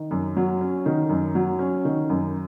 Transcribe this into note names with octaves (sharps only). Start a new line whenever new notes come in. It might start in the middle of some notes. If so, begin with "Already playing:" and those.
Already playing: D#3
F#2
F#3
C#4
D#3
F#2
F#3
C#4
D#3
F#2